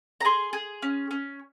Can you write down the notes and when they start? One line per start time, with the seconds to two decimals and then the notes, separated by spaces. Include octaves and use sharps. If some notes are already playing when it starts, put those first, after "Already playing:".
0.21 A#5
0.25 G#4 C6
0.53 G#4
0.82 C#4
1.11 C#4